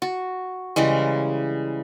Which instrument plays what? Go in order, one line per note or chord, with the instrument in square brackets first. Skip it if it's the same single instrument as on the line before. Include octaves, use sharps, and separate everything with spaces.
[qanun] F#4
C#3 E3 G3 G#3